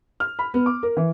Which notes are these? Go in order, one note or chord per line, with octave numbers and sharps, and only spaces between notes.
F6
B5
B3
D6
A#4
E3